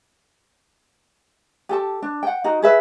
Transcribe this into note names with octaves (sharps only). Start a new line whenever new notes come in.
G4 A4 A5
D4
F#5 G5
D#4 F#4 A#4
G#4 B4 E5